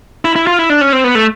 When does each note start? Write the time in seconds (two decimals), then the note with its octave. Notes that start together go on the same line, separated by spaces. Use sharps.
0.25 E4
0.36 E4
0.47 F4
0.59 E4
0.70 D4
0.81 C#4
0.93 C4
1.04 B3
1.15 A3